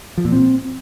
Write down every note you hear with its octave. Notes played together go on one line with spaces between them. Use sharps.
F3
A#2
C4